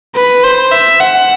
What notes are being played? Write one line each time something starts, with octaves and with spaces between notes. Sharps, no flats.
B4
C5
E5
F#5